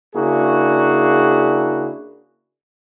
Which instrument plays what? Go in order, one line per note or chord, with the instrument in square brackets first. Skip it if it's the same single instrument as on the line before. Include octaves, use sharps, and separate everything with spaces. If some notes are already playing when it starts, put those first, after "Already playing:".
[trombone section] C#3 A#3 D4 E4 F#4 G#4